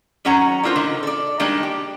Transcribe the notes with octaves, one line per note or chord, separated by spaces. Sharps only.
D#3 F#3 C#4 F#5 A#5
D4 E4 F4 A#4 C5
A#2 D3 D#3
A4 D5
D#3 G3 G#3 A#3 D4
G4